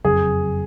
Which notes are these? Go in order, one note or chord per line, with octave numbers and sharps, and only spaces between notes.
F#1 F2 C#3 F#3 G#4